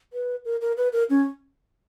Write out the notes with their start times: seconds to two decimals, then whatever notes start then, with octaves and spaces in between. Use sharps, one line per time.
0.13 B4
0.45 A#4
0.61 A#4
0.77 B4
0.93 A#4
1.10 C#4